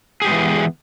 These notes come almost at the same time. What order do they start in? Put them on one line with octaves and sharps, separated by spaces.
G#4 G4 G#3 B3 E3